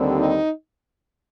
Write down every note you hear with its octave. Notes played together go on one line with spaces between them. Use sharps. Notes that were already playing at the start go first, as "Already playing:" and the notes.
Already playing: D#2 D3 G3 C4
D#4